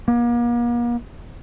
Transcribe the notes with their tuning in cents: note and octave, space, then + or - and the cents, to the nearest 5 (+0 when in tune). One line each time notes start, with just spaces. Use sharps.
A#3 +40